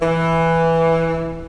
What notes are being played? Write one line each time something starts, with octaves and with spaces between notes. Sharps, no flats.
E3